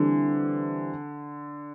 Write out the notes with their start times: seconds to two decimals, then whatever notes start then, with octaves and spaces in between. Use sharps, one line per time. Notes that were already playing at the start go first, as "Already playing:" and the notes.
Already playing: D3 E3 G3 C4 E4 A4